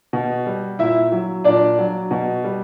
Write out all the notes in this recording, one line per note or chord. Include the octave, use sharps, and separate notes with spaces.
B2
G3
A#2 E4 E5
F#3
A#2 D4 D5
F#3
B2
G3